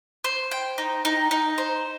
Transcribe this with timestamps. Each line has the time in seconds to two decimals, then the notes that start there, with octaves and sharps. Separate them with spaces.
0.24 C5
0.51 G5
0.78 D#4
1.05 D#4
1.31 D#4
1.58 C5